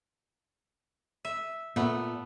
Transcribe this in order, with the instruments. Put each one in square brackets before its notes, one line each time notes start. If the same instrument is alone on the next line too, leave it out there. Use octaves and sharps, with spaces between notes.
[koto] E5
[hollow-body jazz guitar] A#2 [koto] A3 B3